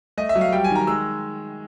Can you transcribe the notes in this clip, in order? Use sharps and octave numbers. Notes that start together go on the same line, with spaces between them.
A3 D#5
E5
F#3
F5
G3 G5
G#5
D#3
A#5
G#3 E6